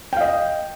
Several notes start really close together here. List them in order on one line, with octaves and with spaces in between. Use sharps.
G5 F5 D#5